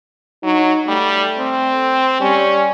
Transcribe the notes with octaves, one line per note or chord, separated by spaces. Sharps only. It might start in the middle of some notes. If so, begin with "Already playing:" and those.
F#3 D#4
G3 A3
C4
G3 C#4